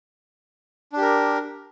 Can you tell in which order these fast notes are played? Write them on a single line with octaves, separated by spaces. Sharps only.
D4 G4 A#4